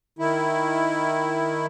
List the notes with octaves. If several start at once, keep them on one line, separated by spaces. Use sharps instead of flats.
D#3 E4